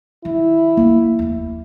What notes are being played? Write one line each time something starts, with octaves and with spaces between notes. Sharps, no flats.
D#3 E4
D2 D3 A#3
F1 D#2